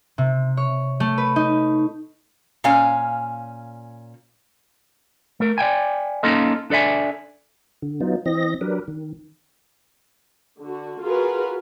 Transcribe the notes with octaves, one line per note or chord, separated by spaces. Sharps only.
C3
C#5
A3
B4
D#4
A#2 C#4 F5 G#5
A3 A#4
D5 F5 G5 G#5
A#3 C#4 D#4 F4 A4 D#5
D4 A4 D5 E5 G#5
D3
F#3 B3 D#4 F4
E3 C4 D#5 A#6
F#3 D4 G4 A#4 B4
D#3
D3 F#4
F4 F#4 G#4 A#4 B4